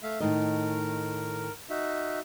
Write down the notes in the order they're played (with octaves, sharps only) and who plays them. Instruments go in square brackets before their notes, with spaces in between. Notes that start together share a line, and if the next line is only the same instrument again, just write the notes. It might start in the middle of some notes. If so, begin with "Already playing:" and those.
[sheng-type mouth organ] A3 E5 F5
[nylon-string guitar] A2 D#3 D#5 [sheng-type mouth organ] A#4
[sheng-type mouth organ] D#4 F#4 E5